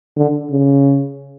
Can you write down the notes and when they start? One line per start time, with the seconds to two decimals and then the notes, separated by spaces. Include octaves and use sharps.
0.17 D3
0.51 C#3